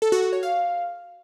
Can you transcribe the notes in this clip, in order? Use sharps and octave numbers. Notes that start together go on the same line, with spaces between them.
A4
F#4
F#4
C#5
F5